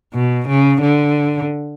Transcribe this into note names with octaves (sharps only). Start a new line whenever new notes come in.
B2
C#3
D3